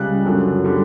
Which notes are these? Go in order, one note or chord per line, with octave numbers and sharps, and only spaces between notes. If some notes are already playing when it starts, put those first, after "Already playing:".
Already playing: C#2 C#3 G3 F#6
F#2 D3 F#3
D3 G3